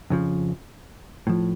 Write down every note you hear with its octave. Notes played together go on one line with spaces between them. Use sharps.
F2 C#3 F3
A2 F3